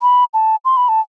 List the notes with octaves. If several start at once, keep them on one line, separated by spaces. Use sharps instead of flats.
B5
A5
C6
B5
A5